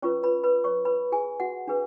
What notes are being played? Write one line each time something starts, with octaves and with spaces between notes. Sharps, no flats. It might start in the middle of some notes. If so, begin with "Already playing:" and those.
C#4 F4 B4 C#5 C#6
B4 B5
B4 B5
C#5 C#6
B4 B5
G#4 G#5
F#4 F#5
D4 G#4 B4